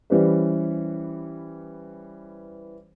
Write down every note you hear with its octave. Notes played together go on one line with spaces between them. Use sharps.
E3 G3 C#4 G4 B4 C5